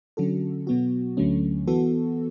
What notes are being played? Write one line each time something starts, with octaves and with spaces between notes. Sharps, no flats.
D3 F#3 C#4 F#4 A4
B2 F#3 B3 F#4
D2 D3 F#3 A3 C#4
E3 B3 F#4 A4